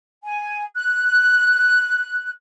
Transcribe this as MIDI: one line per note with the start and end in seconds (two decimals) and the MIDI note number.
0.23 0.64 80
0.76 2.30 90